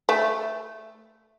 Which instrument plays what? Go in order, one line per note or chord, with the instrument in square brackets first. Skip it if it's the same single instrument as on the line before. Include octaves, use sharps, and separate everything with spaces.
[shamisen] A3 E5